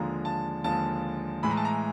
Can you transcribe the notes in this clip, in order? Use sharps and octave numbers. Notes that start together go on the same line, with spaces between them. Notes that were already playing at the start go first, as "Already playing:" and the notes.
Already playing: D#2 D3 F3 G#3 A#5
A5
D#2 D3 F3 G#3 A5
A2 E3 G#3 B5
A#5
A5
A#5